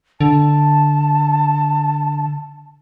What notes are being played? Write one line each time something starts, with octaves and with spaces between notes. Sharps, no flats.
D3 A5